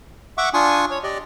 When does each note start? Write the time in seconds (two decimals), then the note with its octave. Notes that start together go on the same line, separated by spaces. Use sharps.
0.38 E5 F#5 C#6 D6
0.54 D4 F4 G#5 C#6 D#6
0.91 C#5
1.03 G4 D5 D#5